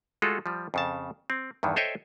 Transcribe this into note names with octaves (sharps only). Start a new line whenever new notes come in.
G#3 A3 F4 F#4 A4
F3 G3
F2 C#3 A5
C4
E2 G2 D#3 E3
A4 C5 C#5 D#5 E5 G5